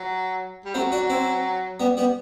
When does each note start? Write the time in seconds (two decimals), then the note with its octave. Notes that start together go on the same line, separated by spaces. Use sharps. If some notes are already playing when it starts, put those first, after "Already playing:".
Already playing: F#3
0.65 G3
0.74 F#3 A3 C4
0.92 D4 F#4
1.10 C4 E4
1.80 G3 B3
1.97 G3 B3